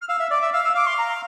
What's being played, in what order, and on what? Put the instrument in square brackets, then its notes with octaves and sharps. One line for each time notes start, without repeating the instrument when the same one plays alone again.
[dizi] F6
[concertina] F5 [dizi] E6
[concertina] E5
[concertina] D5 [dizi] D6
[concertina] E5
[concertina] F5 [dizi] E6
[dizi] E6
[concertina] F5 [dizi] D6
[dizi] C6
A#5